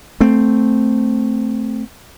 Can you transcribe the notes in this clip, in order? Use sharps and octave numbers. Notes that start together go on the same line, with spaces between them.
A3 C4